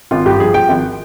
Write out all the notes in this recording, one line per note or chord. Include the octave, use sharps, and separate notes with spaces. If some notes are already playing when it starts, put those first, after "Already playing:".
G#1 F4
G2 G4
F3 G#4
F3 G5
G#1